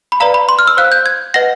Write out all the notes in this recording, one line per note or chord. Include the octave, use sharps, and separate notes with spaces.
B5
B4 D5 F5 A#5
B5
C6
F6
E6
C5 F5 F#6
G6
G#6
B4 D#5 F#5 A#6